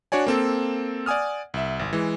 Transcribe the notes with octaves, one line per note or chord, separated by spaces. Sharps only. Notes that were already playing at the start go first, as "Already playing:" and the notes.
D4 F#4 C#5 D5 G#5
A#3 C4 A4
D5 F#5 G#5 D#6 F6
C2 E5
G#1
E3 G#3